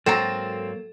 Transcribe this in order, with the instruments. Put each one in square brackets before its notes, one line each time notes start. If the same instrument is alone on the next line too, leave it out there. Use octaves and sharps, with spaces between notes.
[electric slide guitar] G#2 F#3 A#3 [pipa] C4 F#4 A#5 [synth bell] A4